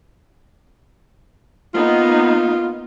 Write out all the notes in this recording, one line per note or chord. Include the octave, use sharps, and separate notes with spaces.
A#3 B3 D#4 F4